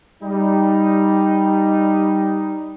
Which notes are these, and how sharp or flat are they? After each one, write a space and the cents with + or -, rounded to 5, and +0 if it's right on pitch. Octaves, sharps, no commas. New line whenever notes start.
G3 +0 D#4 +0